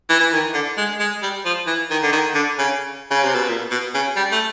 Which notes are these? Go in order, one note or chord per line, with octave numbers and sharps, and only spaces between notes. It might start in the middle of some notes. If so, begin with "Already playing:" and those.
E3
E3
D#3
D3
G#3
G#3
G3
F3
E3
D#3
D3
D#3
D3
C#3
C#3
C3
B2
A#2
B2
C#3
G3
A3